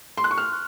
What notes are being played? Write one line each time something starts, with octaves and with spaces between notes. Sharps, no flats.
C6
F#6
C#6
F6